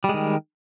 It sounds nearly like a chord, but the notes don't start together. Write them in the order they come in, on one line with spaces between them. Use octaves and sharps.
G3 G#3 D#3